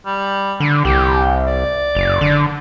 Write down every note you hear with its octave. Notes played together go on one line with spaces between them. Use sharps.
G3
D3
C2 G4
D5
F#1
D3